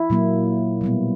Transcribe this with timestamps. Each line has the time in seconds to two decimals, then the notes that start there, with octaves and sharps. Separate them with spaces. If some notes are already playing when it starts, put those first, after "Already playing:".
Already playing: E4
0.10 A#2 F#3 A#3
0.81 B2 G3 B3